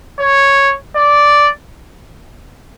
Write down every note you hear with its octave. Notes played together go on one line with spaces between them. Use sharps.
C#5
D5